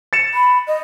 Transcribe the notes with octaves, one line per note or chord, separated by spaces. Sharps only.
A6 C#7 E7
B5
D#5